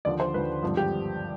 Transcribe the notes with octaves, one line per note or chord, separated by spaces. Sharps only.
D#2 D3 F3 D5
C5
D#2 D3 F3 B4
G#1 G2 D3 F3
G4